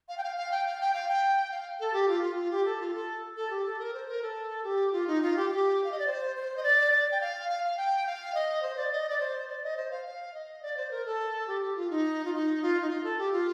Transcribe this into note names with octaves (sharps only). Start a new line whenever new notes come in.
F5
G5
F5
F5
G5
F5
G5
F5
G5
F5
A4
G4
F4
F4
F4
G4
A4
F4
A4
A4
G4
A4
A#4
C5
A#4
A4
G4
F4
D#4
F4
G4
G4
F5
D#5
D5
C5
C5
D#5
D5
D5
G5
F5
F5
F5
G5
F5
D#5
C5
D5
D#5
D5
C5
D5
D#5
C5
F5
F5
D#5
D5
C5
A#4
A4
G4
G4
F4
D#4
F4
D#4
F4
D#4
F4
A4
G4
F4